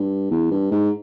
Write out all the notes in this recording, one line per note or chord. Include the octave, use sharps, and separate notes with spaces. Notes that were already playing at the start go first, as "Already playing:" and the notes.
Already playing: G2
E2
G2
G#2